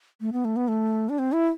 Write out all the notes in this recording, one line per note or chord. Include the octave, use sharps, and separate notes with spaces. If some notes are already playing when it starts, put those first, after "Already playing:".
A3
B3
A3
B3
A3
D4
C4
E4